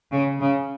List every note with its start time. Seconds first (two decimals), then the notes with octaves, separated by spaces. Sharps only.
0.12 C#3
0.40 C#3